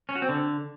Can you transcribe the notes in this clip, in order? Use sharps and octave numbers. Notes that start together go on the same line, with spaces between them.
C#4
F#4
C4
D3